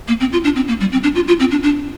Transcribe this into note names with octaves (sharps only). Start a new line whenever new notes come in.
A#3
C4
F4
D4
C4
A#3
G3
C4
D4
F4
F4
C4
D4
D4